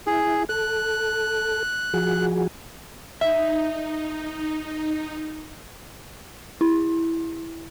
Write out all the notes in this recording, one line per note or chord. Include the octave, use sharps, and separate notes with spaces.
E4 G#4
A4 F#6
F3 F#4 G#4
D#4 E5
E4